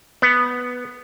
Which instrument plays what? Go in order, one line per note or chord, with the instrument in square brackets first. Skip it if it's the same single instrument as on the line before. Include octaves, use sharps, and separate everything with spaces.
[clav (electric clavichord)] B3